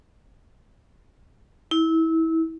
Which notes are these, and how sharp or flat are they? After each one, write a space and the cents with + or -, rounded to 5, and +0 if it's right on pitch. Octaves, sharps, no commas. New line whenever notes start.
E4 -25